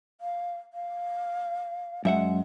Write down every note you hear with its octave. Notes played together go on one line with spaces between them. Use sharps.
F5
F5
F#2 G#3 E5 F#5